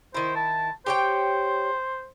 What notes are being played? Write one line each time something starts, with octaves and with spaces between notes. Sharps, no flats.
D#3 E4 C5
A5
G4 C5 C#5 G5